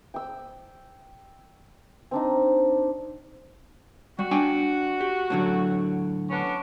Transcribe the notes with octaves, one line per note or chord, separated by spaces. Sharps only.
G5 E6
C4 D4 D#4
G3 F#4
D4 G5 G#5
G4
A2 D3 F#3
B3 C#4 D4